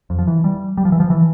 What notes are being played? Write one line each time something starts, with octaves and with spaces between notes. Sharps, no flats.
F2
F3
E3
G3
G3
F3
E3
F3
E3